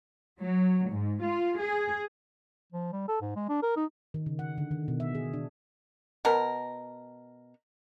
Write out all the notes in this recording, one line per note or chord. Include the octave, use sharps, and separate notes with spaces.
F#3
G#2
F4
G#4
F3
G3
A4
G#2
G#3
D4
A#4
D#4
D#3
C#3
F#5
D3
D#3
B2
E5
G#4
D4
B2 A#4